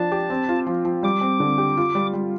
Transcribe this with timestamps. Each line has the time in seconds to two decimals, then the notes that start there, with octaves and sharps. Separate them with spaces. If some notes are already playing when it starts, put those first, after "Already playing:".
Already playing: F3 D4 A5
0.12 G4
0.30 C4
0.49 F4
0.67 F3
0.85 F3
1.03 G3 D6
1.21 C4
1.40 D3
1.58 G4
1.77 F4
1.95 G3
2.13 G3